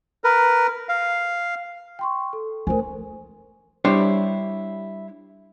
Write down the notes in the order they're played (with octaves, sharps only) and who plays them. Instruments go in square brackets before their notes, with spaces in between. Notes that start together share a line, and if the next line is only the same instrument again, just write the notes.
[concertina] A#4 B4
F5
[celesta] G5 C6 C#6
A4
[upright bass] D2 A3 [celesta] A#4 C5 G#5
[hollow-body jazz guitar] G3 D4 E4 G4 C5 C#5